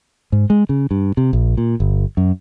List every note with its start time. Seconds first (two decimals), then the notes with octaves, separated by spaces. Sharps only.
0.32 G#2
0.50 G#3
0.69 C#3
0.91 G2
1.17 C3
1.33 A#1
1.57 A#2
1.80 G1
2.17 F#2